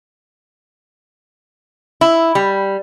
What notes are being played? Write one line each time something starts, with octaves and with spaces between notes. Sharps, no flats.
E4
G3